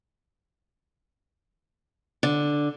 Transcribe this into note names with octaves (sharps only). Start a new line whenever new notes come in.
D3